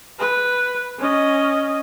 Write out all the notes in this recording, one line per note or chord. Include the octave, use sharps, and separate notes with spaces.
B4
C#4 D#5